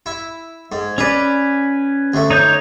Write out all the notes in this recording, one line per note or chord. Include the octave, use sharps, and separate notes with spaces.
E4
G#2
C#4 G#4 B4 D5
D2 A3
D#4 C#5 G6